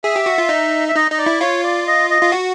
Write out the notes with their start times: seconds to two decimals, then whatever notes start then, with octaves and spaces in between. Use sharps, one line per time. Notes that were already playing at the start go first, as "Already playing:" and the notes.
0.04 G#4 E5
0.16 G4
0.26 F#4
0.38 F4
0.49 D#4
0.88 E5
0.95 D#4 D#5
1.11 D#4 D#5
1.18 D5
1.26 E4
1.41 F4 C#5
1.64 D5
1.87 D#5
2.10 D#5
2.21 F4
2.32 F#4